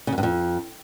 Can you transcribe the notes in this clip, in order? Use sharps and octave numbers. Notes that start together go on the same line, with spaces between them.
C#3
F#2
G2
F2